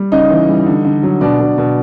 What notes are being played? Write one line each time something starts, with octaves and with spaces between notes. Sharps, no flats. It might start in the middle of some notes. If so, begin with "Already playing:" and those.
Already playing: G3
C#3 D#4 D#5
E3
G3
D3
D3
F#3
B2 D4 D5
B2
B2